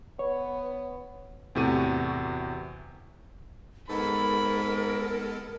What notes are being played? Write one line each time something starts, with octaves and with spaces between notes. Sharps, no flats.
B3 C#5
E2 A2 C3 F#4 A4 D#7
G#2 G#3 B3 A4 A#4 B5